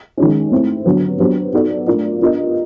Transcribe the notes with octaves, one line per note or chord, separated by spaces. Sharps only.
D#3 G#3 C#4
A3 C4 E4
D3 F#3 B3
F#3 B3 D4 G4 C5
B3 D#4 F#4 A4 D5
A3 D4 F4 A#4 D5
B3 D4 F4 A#4 D#5